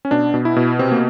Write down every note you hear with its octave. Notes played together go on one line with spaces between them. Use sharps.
C#4
B2 D4
B2
E4
B2
C3 C4
A#3